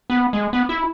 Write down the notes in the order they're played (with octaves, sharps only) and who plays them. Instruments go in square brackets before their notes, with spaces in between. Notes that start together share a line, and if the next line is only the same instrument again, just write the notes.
[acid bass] B3
G#3
B3
E4